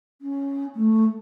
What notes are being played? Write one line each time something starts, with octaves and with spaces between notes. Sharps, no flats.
C#4
A3